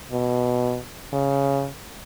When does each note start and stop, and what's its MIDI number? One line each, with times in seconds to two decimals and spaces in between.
0.11 0.79 47
1.12 1.67 49